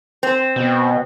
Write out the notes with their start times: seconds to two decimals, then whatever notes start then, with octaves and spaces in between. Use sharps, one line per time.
0.23 C4
0.56 B2